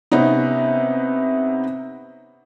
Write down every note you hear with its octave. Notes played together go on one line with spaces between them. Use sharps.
C3 B3 C#4 D#4